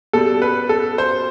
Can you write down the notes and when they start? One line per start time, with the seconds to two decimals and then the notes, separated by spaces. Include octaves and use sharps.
0.13 B2 G3 A4
0.42 B4
0.69 A4
0.98 C5